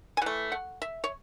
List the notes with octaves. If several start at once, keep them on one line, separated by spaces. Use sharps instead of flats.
G#5
E3 A3 F#5
F#5
E5
C#5